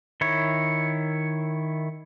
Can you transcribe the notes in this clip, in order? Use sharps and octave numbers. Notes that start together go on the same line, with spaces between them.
D#3 E4 C#5